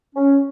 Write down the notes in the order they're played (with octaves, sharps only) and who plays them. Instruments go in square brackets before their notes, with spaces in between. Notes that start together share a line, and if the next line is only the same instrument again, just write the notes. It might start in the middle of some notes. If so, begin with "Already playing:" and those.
[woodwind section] C#4